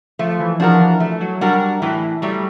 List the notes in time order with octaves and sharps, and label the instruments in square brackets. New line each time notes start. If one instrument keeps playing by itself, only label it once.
[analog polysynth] F3 [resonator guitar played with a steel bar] A3
[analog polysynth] E3
[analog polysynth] F3 [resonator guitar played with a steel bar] D4 F#4 A#4
[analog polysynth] E3
[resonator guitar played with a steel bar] A3
[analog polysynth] F#3
[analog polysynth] G3 [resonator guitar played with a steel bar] D4 F#4 A#4
[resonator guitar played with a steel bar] A2 [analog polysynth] E3
[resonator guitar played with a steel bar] F#3 A3 [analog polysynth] G3